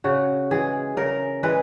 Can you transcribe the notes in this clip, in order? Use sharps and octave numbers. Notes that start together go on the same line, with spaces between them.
C#3 F#4
E3 G#3 G#4
C#3 A#4
E3 G#3 B4